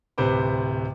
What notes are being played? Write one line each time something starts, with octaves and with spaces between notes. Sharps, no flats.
D1 C3 B4 C5 D6